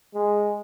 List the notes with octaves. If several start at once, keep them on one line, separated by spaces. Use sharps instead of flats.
G#3